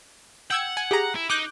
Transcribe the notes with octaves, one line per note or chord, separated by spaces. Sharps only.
F#5 G5 E6 G#6
G#5
G4 G#4 A#5
E4
D#4 D6 F#6 G6